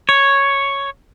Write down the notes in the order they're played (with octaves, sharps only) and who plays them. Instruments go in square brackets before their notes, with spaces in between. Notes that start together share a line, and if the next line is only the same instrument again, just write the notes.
[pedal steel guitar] C#5